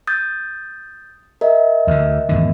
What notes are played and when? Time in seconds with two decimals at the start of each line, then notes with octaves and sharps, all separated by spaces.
0.07 D#6 G6 A6
1.41 A#4 D#5 E5
1.87 D2 D3
2.29 G#1 E2 D3